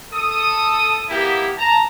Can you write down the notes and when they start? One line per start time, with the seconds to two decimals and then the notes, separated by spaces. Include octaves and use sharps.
0.12 A4 D#6
1.10 A#3 B3 E4 G4
1.57 A5 A#5